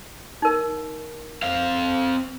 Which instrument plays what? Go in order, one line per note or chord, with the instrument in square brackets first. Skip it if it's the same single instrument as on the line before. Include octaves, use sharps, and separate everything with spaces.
[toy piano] D#4 A#4
[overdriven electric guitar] C4 F5